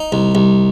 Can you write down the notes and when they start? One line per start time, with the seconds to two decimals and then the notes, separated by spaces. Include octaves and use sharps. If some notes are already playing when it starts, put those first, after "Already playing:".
Already playing: D#4
0.12 C2
0.35 C2